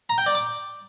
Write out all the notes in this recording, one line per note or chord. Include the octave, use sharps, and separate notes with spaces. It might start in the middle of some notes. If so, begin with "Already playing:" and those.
A#5
G5
D5
D6